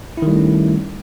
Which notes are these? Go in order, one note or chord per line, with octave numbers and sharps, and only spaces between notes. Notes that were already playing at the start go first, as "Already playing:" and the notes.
D#3 G3 A3 C#4 E4